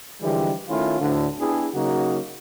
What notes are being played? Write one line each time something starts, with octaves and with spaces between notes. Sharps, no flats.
D3 E3 F3 G3 G#3 G4
D#3 A3 C#4 E4 F4
D2 A2 D3
B3 D4 E4 G4 G#4
C#3 F#3 A#3 D#4 F#4